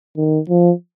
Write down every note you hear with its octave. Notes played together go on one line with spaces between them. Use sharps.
D#3
F3